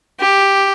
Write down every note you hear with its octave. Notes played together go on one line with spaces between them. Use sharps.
G4